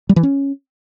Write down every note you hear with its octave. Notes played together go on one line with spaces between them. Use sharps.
G3
E3
C#4